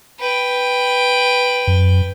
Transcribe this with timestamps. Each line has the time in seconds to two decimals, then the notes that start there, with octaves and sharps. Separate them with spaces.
0.19 B4 G5
1.67 F#2